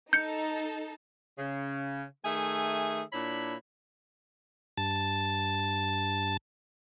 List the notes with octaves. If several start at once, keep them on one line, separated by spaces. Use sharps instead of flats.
D#4 A4 G6 C#7
C#3
D#3 A3 G#4 E5 G#5
A#2 D4 E4 C#5 B5
G2 A5